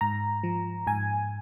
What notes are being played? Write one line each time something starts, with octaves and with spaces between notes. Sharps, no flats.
G#2 A#5
F3
G#2 G#5